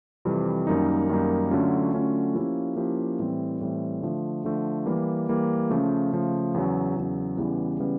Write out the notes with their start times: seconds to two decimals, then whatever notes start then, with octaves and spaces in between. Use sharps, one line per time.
0.25 F2 C3 E3 G3
0.67 F#2 D#3 G3 A#3 D#4
1.09 F#2 D#3 G3 A#3 D#4
1.51 D3 F#3 A3 C#4 F4
1.93 D3 F#3 A3 C#4 F4
2.34 F3 A#3 C#4 E4 G4
2.76 F3 A#3 C#4 E4 G4
3.19 A2 E3 G3 C4
3.61 A2 E3 G3 C4
4.02 D3 F3 A3
4.45 D3 F3 A3
4.86 E3 G3 A#3
5.29 E3 G3 A#3
5.70 C#3 F3 A3
6.13 C#3 F3 A3
6.54 E2 C#3 F#3
6.96 E2 C#3 F#3
7.37 E2 C#3 E3 G3 B3
7.80 C#3 E3 G3 B3